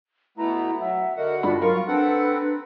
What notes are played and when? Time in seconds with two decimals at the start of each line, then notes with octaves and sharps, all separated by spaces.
0.38 B2 A3 B3 E4 A#5
0.80 F#3 E5 F#5
1.17 D3 F#4 A#4 D#5 F#5
1.43 G2 D4 F4 B5
1.62 F#3 F4 A#4 F5 C#6
1.88 C4 D4 A4 B4 F#5